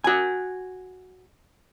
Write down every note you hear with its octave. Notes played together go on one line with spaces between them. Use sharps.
F#4 G#5